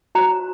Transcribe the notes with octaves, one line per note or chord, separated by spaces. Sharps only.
F#4 C5 A#5